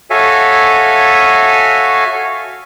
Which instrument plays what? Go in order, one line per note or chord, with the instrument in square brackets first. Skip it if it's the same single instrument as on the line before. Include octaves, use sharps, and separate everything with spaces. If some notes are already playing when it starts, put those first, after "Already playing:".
[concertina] F#4 A4 C#5 E5 F5 G#5